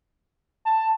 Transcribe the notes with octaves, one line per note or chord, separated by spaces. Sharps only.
A5